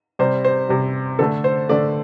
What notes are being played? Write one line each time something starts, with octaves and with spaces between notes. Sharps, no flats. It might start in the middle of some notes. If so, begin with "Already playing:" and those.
C3 G3 C5
C5
C3 G3
D3 A3 A4
C5
D3 A3 D5